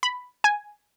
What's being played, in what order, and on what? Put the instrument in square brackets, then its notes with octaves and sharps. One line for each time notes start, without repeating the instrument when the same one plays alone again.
[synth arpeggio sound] B5
G#5